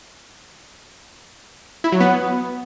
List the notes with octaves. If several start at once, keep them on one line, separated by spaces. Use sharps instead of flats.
E4
F#3
B3